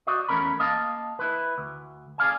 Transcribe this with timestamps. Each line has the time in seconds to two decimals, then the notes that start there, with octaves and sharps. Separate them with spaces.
0.07 F#4 C5 D5 D#5
0.29 E2 A3 C#4 A#4 B5
0.59 A#3 D#5 F5 A5
1.19 E4 B4
1.58 D2
2.18 G#4 D5 F5 G#5